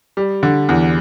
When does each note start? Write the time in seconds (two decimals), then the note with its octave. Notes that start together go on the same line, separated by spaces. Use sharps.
0.17 G3
0.43 D3
0.69 E2